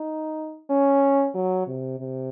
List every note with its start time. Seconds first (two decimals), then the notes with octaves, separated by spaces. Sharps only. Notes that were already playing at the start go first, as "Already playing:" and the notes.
Already playing: D#4
0.70 C#4
1.35 F#3
1.67 C3
2.00 C3